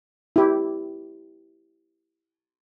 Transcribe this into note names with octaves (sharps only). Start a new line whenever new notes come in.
E4 G4